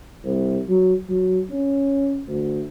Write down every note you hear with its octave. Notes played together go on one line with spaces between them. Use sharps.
C2
F#3
F#3
C#4
D2